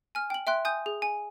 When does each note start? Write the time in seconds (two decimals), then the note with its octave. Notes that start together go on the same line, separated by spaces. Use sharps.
0.15 G#5 F6
0.30 G5 F#7
0.47 E5 G5 C6 F#6
0.65 G#5 D#6 G6
0.86 G#4
1.02 G#5